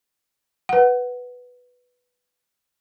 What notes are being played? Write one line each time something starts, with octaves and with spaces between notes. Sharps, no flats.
B4 F#5